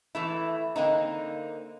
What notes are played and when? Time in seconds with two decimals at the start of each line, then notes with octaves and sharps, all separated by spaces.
0.15 E3 A3 E4
0.76 D3 A#3 C4 D#4